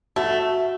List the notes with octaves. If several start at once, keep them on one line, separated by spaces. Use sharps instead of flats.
A3 F#4